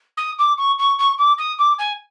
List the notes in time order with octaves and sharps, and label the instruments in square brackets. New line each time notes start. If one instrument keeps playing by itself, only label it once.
[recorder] D#6
D6
C#6
C#6
C#6
D6
D#6
D6
G#5